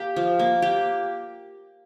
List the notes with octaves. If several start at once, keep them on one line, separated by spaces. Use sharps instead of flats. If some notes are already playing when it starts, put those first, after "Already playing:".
Already playing: A#3 G4
F3
A#3
G4